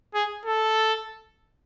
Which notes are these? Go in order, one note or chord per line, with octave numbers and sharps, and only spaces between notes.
G#4
A4